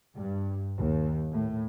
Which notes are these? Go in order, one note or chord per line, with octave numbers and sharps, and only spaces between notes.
G2
D#2
A2